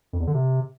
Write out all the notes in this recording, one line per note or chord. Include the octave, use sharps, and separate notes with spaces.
F2
E2
D3
C3